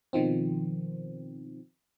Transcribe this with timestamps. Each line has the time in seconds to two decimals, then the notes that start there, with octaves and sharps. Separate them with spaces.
0.13 B2 D#3 F3 C4